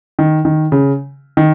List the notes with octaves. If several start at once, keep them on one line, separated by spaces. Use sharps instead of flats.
D#3
D#3
C#3
D#3